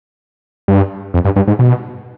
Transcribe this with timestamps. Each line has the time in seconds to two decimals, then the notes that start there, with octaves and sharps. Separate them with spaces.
0.68 G2
1.14 F2
1.25 G2
1.36 G2
1.48 G#2
1.59 B2